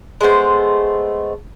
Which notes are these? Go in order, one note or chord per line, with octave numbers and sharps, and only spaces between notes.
G#3 A3 B3 C5